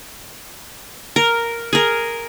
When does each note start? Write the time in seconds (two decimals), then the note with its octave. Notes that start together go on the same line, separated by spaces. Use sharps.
1.16 A#4
1.73 G#4 A#4